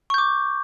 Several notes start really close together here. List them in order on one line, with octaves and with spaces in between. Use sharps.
C#6 G6 D6